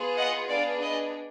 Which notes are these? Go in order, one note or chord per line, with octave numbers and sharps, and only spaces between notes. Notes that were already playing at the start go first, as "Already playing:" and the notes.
Already playing: B3 F4 G#4
D#5 F#5
B3 D4 G#4 D5 F5
B4 D#5